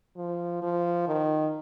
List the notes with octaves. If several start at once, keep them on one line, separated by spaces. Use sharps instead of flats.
F3
F3
D#3